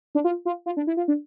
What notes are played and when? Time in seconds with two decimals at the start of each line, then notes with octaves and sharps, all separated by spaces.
0.15 D4
0.24 F4
0.45 F4
0.66 F4
0.77 D4
0.87 E4
0.97 F4
1.08 D4